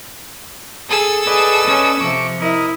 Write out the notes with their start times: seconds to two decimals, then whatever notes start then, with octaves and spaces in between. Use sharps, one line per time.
0.89 G#4 A4 E6
1.27 G#4 B4 D5 D#5
1.67 C#4
2.00 C3 F3 C#6 D6
2.42 E4 A#4 D#5